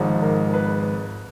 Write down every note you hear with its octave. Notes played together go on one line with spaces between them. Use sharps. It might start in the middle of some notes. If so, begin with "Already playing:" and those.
Already playing: G#1 G#2 F3
A#4
B4